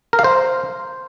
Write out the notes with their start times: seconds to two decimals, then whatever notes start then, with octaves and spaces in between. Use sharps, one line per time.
0.13 A#4
0.19 F5
0.24 C5